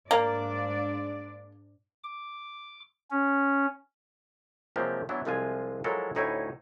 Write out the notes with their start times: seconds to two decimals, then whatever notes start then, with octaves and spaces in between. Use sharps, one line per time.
0.11 G#2 A#3 D4 D5
2.04 D6
3.10 C#4
4.76 C3 F3 F#3 G#3 A#3 G4
5.09 E3 F#3 B3 D4 E4
5.25 C2 C3 F3 G#3 F4 G#5
5.84 F3 F#3 G#3 E4 A4 A#4
6.15 D2 A2 D#4 E4 C#5 G#5